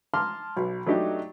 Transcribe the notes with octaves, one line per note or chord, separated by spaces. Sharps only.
A5 A#5 C6 D6 F6
B1
F#3 A3 D4 D#4 G4